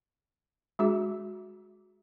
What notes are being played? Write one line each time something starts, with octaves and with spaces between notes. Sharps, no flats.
G#3 D4 F#4 G#4